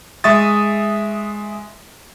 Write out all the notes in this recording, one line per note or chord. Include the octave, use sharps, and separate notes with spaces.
G#3 E5 C#6 D#6 A6